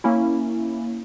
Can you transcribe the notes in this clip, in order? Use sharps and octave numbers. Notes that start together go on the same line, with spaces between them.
A#3 C#4 E4